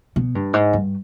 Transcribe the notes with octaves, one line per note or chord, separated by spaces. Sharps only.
B2
G2
G#2
G2